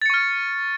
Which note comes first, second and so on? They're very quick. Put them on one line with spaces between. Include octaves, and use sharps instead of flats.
A6 C#7 C#6 F6